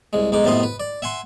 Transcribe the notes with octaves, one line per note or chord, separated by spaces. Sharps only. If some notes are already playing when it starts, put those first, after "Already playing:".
C2 G#3
B1 G#3 D#4 D6
F#2 A2 C3 B3 D#5 C6
B4
D5
E5 F#5 G#5 C6